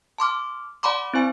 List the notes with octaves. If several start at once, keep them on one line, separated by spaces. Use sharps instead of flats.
A5 C6 D6 F6
D5 F#5 A5 B5 C6 D6
C4 E4 C5 G#5